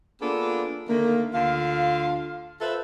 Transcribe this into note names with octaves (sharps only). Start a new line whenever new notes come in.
A#3 B3 D4 F4 G#4 A4
D3 D#3 A3 A#3
D2 D3 F4 F5
F4 A4 B4 C5 E5